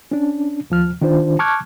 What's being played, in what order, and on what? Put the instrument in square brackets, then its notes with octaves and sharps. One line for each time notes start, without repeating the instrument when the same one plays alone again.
[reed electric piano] C#4 D4
D#2 F3 F6
D#3 D4 F4 C5
A5 C#6 D6 F6 F#6 G#6